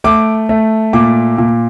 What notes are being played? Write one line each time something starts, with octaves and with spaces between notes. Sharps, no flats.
A3 D6
A3
A#2 D6
A#2